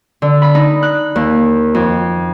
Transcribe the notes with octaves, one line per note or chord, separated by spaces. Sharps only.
D3
B5
D#4
F#6
D#2
F2